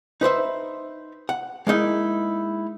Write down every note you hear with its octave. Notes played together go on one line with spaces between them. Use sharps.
D#4 B4 C5 E5
F#5
G#3 A#3 D#4 E4